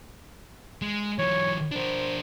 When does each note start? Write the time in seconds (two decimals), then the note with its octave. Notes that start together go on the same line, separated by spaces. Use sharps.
0.82 G#3
1.19 E3 F#3 C#5
1.71 D4 A#4 C5